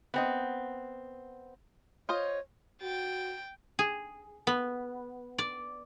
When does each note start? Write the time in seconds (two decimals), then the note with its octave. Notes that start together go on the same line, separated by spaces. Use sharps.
0.14 B3 C4 D#5
2.09 F4 C5 C#5 D#5
2.82 F#4 G5 A6
3.79 G#4
4.47 B3
5.38 D5